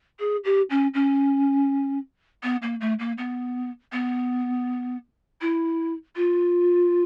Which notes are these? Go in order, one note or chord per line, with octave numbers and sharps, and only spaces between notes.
G#4
G4
C#4
C#4
B3
A#3
A3
A#3
B3
B3
E4
F4